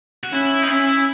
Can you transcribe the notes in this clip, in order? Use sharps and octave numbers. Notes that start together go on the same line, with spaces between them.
F#4
C#4 E4
D#4
C#4 E4